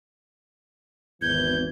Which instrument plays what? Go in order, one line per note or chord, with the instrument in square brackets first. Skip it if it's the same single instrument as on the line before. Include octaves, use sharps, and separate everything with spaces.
[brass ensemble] G#1 E2 E3 [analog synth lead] G6 [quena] G#6